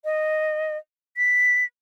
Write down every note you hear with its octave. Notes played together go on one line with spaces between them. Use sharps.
D#5
B6